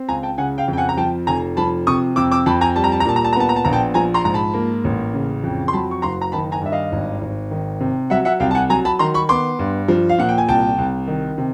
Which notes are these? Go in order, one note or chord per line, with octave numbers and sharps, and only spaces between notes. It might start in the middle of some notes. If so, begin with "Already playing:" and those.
Already playing: C4
C#2 G#5 A#5
G5 A5
C#3 F#5 G#5
F5 G5
F2
G5
F#5 G#5
A#5
F3 G5 A5
F1 G#5 A#5
F3 A5 B5
C3 C#6 D#6
F2 D6 E6
D6 E6
F2 A5 B5
G#5 A#5
G3 A5
A#5
A5
A#5
A#2 A5
A#5
A5
A#5
B3 A5
A#5
A5
A#1 A#5
G5 A5
F3 G#5 A#5
A#5 C6
G#2 A#5
A5 B5
A#3
A1
C#3
F2
C6
F#3 A5 B5
C#6
F#1 A#5 C6
A#5
D#3 A5 B5
G#5 A#5
G2 E5
D#5 F5
G#1
G#1
D#3
C3
F#3 E5 F#5
E5 F#5
C2 F5 G5
A5
F#5 G#5
F#3 G#5 A#5
A5 B5
D#3 A#5 C6
B5 C#6
B3 C6 D6
G2
F3
F5
A#2 F#5
G5
G#5
C2 G5 A5
C2
D#3
C3